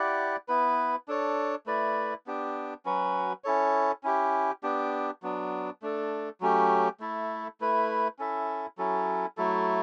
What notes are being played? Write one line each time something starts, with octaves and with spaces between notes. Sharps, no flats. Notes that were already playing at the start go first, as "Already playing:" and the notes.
Already playing: E4 G4 D5 F#5
B3 E4 B4
D4 A4 C#5
A3 E4 B4 D5
B3 D4 G4
F#3 C#4 F#4 B4
C#4 E4 A4 C#5
C#4 E4 G4
B3 D4 G4
F#3 B3 D4
A3 D4 A4
F#3 A3 C#4 G4
A3 E4 A4
A3 E4 B4
C#4 E4 A4 E5
F#3 C#4 E4 A4
F#3 A3 E4 A4